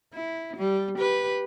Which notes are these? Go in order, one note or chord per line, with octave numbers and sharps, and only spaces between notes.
E4
G3
G4 B4